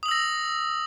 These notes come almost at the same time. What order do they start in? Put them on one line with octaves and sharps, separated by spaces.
D#6 F#7 E6 A#6